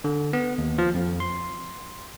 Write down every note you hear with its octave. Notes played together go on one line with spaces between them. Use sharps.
D3
B3
D#2
F3
F2
C6